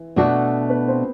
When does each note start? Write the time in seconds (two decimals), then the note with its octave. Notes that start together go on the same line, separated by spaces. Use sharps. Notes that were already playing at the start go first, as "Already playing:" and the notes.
Already playing: E3
0.16 B2 A3 D4 F#4 A4
0.70 B3 B4
0.88 C4 C5